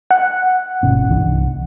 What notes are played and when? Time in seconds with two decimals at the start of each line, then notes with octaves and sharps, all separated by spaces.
0.11 F#5
0.83 G1 B2 C#4
1.09 C2 E3 D4